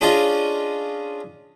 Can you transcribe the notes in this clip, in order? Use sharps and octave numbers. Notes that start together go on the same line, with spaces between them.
C#4 D4 F4 G#4 D#5 G#5